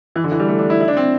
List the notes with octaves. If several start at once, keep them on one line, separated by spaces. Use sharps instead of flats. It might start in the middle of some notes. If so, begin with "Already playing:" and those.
E3
D3
E3
G3
A3
D4
E4
E4
D4
C4